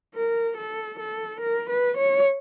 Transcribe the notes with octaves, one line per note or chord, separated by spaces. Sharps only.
A#4
A4
A4
A#4
B4
C#5